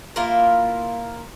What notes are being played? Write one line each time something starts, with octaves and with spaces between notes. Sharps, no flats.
A#3 E4 F4 A#4